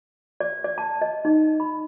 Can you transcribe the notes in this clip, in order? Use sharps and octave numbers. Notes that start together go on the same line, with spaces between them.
D5
D5
A5
D#5
D#4
B5